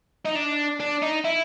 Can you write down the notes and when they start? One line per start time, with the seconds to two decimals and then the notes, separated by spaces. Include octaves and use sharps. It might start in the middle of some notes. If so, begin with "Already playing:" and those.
0.26 D#4
0.36 D4
0.80 D4
1.02 D#4
1.25 E4